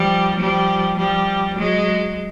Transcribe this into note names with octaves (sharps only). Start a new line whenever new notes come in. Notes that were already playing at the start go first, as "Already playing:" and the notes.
Already playing: F3 G3
F3 G3
F3 G3
F#3 G#3